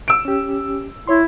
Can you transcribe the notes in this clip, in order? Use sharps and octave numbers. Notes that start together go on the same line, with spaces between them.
E6 D7
C#4 G4
E4 C#5 C6